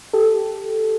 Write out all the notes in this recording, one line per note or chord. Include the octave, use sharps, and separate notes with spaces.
G4 A4